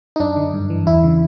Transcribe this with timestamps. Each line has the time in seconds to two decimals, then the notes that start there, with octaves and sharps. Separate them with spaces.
0.16 D#4
0.20 F#2 D4
0.37 D3
0.54 G2
0.70 E3
0.86 E2 E4
1.03 C#3